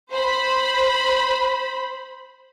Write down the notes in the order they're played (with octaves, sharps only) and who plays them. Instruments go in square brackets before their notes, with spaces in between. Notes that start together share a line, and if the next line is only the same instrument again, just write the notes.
[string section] C5 B5